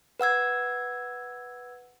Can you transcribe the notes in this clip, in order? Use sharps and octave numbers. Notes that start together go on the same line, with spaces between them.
B4 F#5 E6 G#6